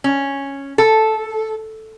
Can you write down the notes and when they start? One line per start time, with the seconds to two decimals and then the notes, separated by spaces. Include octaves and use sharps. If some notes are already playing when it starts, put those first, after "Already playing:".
0.04 C#4
0.78 A4